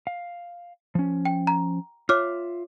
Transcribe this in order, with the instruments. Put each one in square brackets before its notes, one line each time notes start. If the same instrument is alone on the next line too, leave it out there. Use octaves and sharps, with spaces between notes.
[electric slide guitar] F5
F3 C#4
[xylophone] G5
A#5
[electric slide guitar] F4 E5 [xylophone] C#5 D6 F6